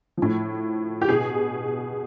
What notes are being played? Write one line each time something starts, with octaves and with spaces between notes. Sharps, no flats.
A2 F3
G4
B2 G#4